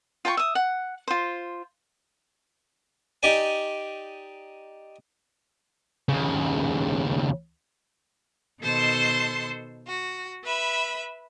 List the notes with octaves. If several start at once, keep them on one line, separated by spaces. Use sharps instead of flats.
F4 G5 A5 C#6
E5 D#6
F#5
F4 C5
D#4 G4 D5 G#5
D#2 C#3
B2 D#3 A4 C5 A5 C6
F#4
B4 E5 B5